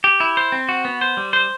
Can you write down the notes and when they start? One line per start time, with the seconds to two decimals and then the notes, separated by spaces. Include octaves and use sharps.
0.04 G4
0.20 E4
0.37 C5
0.52 C4
0.69 F#4
0.85 B3
1.01 C5
1.17 G3
1.33 C5